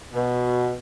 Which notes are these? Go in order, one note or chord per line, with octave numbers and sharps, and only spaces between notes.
B2